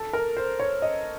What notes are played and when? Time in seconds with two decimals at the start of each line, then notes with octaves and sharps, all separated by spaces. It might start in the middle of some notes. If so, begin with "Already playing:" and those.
Already playing: A4
0.13 A#4
0.37 C5
0.59 C#5
0.82 D#5